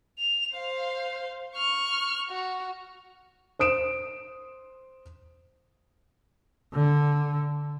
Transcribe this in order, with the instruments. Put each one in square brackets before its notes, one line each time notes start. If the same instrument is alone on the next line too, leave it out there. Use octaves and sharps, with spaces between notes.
[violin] F7
C5 F5
C#6 F6
F#4
[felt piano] C5 D#6 D7 E7
[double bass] D3